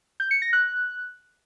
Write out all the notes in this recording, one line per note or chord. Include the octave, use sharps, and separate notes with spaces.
G6
C#7
A#6
F#6